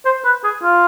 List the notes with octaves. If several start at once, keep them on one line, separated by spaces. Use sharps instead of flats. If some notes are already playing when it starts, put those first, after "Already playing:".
C5
B4
G#4
F4